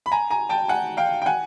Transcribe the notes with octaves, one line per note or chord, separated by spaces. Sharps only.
B5
G#5 A#5
G#5 A#5
G5 A5
F#5 G#5
F5 G5
G5
F#5 G#5